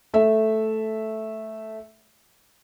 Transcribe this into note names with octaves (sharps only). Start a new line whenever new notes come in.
A3 E5